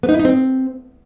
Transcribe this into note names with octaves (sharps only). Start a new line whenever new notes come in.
B3
D#4
E4
D#4
C4